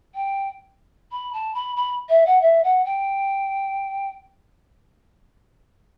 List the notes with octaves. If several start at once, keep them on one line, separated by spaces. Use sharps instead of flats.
G5
B5
A5
B5
B5
E5
F#5
E5
F#5
G5